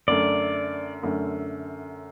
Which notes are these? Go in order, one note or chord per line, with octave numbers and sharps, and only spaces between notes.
F#2 D3 A3 D5
F#2 D3 A3